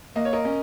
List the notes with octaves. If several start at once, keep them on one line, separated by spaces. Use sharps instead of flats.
A#3 D#5
C#5
A#4 D#5
C#4